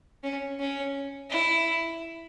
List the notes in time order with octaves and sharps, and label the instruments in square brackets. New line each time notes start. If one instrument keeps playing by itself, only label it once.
[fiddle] C#4
C#4
E4